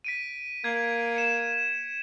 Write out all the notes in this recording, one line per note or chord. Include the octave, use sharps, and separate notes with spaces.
B6 D7 D#7
A#3 G#6
C#7 E7